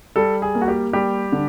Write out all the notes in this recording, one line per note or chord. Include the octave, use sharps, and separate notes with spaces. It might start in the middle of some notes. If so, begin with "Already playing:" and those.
G3 A4
G#4
A#3
F#4
G4
G3 G4
D3